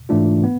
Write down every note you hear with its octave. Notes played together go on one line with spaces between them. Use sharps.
G#2 E3 A3 D4 F4
B3